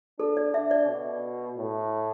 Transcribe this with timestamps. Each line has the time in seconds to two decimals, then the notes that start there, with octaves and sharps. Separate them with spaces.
0.19 D4 A4
0.37 D5
0.54 D4 E5
0.71 D5
0.88 B2
1.57 A2